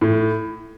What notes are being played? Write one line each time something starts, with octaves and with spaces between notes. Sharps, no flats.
A2